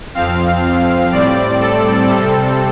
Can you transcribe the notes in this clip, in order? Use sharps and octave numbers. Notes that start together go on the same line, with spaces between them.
F2 F3 C4 F5
A2 G3 C4 D5
A4
C3 G3 C4 A4